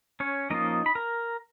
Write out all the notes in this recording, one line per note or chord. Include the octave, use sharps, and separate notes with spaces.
C#4 C#5
F3 A#3 C#4 D#4 F4 D#5
B5
A#4 A#5